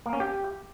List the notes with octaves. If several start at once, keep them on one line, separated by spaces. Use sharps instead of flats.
A#3
C#4
G4